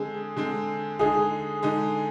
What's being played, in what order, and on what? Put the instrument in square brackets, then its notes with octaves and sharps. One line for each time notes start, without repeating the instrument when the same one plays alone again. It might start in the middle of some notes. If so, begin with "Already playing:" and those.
Already playing: [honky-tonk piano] D3 G#3 C4 [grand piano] G#4
[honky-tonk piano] D3 G#3 C4
[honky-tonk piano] D3 G#3 D#4 [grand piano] G#4
[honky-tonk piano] D3 G#3 D#4